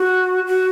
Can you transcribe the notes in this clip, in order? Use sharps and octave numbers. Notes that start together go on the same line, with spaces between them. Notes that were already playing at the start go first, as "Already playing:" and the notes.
Already playing: F#4
F#4